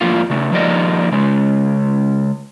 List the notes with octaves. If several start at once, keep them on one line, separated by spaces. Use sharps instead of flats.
F2 A2 F3 A#3 F4
C#3 A3
F3 G3 A#3 D#4 D5 D#5
C#3 G#3